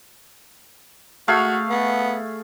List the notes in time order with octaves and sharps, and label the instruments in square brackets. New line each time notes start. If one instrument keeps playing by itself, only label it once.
[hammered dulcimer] A3 G#4 F5 [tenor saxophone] F#4
[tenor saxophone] B3